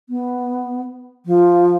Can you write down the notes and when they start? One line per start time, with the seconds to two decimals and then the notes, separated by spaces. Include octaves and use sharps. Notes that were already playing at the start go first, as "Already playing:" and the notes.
0.09 B3
1.26 F3